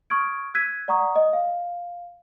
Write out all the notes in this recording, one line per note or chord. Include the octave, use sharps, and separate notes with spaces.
C#6 D#6 F6 G#6 D7
E6 F#6 G#6 B6 D#7
D5 F#5 A#5 C#6 D#6
D#5 D#6
F5